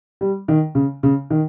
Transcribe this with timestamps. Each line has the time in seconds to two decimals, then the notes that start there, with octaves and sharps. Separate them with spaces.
0.21 G3
0.48 D#3
0.75 C#3
1.03 C#3
1.30 D#3